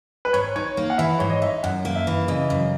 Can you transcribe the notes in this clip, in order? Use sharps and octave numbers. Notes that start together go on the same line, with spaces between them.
B4
G#2 C#5
D#4 C#5
A#3
F#5
E3 E5
G#2 C#5
D#5
D#4 E5
F#2 F#5
A#3
E5
E3
C#3 D#5
F#2